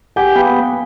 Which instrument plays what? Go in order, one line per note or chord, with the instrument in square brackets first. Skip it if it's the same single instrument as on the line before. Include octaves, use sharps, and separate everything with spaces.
[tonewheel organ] G4 [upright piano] F#5 G#5
[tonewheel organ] B3 [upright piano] F5 G5